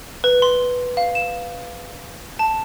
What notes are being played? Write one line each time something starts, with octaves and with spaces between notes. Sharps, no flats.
B4
C6
F5
E7
A5